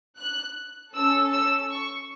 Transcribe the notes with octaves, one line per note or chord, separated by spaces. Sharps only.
F#6
C#4 A4 E6
E6
C#6